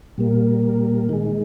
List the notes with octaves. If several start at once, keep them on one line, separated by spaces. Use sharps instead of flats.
A#2 G3 A#3
D#3 G#3